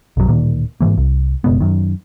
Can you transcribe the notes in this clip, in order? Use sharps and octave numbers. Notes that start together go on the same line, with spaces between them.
B1 F#2 F#3
D1 A#2 D#3 A#3
G#2 C#3 E3 A#3
C2
F#1 B2 G#3 B3
F#2 D#3